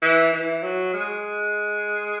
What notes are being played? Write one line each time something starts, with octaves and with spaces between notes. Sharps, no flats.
E3
E3
F#3
G#3